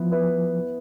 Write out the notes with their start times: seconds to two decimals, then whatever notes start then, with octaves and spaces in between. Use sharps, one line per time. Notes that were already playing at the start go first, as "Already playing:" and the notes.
Already playing: F3 B3 E4 B4
0.11 B3 E4 B4